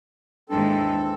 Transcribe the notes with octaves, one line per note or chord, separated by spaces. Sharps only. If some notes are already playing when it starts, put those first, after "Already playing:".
D#2 G#2 E3 C4 D4 A4